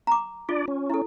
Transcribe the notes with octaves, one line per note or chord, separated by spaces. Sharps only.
A#5 D6
D4 F4 D5
C#4
E4 A4